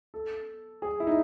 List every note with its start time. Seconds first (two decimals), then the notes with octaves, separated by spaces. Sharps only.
0.14 A4
0.82 G#4
1.00 E4
1.07 D#4